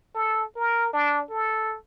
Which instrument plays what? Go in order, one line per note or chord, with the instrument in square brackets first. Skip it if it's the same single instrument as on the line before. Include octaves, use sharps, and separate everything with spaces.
[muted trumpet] A4
A#4
D4
A4